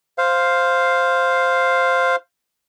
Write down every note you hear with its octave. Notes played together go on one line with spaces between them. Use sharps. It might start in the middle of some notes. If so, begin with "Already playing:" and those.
C5 F5